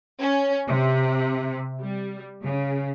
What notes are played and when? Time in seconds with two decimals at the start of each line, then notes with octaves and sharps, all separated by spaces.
0.19 C#4
0.68 C3
1.81 G3
2.44 C#3